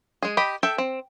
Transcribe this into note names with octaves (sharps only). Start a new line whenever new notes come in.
G#3 G#4
G4 D#5 B5
A4 E5 G5
C4